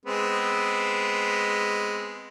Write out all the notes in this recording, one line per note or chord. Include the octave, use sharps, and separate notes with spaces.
G#3 B3 C4